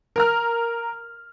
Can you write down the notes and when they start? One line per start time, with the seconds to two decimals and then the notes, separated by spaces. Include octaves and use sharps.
0.16 A#4 A#5 F6